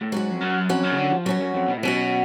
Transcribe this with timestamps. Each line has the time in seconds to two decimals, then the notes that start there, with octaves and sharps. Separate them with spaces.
0.02 A2
0.12 G#2 F#3 C#4 F#4
0.31 F2
0.41 F#2
0.69 F2 F#3 C#4 F#4
0.84 F#2
0.91 C#3
0.98 D3
1.11 F3
1.26 F#2 F#3 C#4 F#4
1.41 F#2
1.54 F2
1.68 B2
1.77 A2
1.83 B2 F#3 C#4 F#4